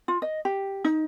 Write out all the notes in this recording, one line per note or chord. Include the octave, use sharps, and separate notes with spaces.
F4
D#5
G4
D#4